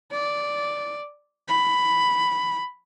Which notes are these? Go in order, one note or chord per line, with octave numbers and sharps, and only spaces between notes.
D5
B5